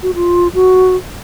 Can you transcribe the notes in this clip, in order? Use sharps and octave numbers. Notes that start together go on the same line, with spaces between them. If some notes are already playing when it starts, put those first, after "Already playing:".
F#4
F4
F#4